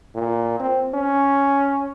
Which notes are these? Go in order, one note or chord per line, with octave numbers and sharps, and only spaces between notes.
A#2
C4
C#4